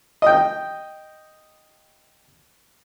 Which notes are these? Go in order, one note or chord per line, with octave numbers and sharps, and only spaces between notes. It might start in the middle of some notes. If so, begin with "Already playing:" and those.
D#5 G5